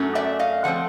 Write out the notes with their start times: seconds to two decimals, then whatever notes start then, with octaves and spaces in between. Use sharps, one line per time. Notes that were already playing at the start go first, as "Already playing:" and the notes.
Already playing: F#2 F#3 A3 C#4
0.15 D5 E5
0.39 D#5 F5
0.64 F3 A3 C4 F#5